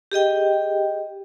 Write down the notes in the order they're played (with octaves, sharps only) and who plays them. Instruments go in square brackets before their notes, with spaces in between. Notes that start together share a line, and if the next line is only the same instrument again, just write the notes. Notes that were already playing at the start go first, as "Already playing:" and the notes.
[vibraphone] G4 G#4 D#5 G5